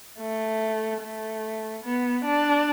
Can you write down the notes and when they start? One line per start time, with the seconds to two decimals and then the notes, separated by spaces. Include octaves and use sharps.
0.19 A3
1.01 A3
1.84 B3
2.25 D4